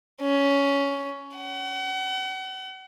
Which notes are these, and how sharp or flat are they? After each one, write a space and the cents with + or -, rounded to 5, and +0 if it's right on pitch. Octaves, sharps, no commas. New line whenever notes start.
C#4 +10
F#5 +40